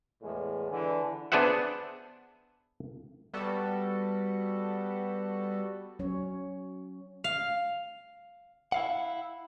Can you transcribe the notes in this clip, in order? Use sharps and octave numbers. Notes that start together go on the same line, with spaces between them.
E2 A2 G#3
D3 E3
B3 D4 G#4 C5 E5 F#5
G3 B3 F#4 A4
F#3 C#4 C#5
F5
E4 F5 F#5